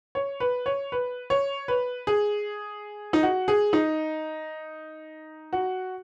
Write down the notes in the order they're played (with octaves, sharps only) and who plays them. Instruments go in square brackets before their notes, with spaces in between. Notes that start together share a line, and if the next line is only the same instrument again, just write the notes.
[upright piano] C#5
B4
C#5
B4
C#5
B4
G#4
D#4
F#4
G#4
D#4
F#4